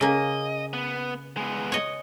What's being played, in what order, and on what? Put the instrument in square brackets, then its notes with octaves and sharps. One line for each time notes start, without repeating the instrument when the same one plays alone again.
[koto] C#3 A#3 [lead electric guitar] D#5
[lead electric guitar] B3
G#3 B3
[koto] C#5 D#5